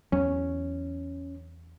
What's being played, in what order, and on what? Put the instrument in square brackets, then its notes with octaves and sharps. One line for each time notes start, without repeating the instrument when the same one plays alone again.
[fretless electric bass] E2 F#3 [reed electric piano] C#4